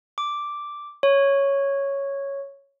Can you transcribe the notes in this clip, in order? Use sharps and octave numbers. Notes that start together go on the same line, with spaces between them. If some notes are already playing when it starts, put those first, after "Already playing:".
D6
C#5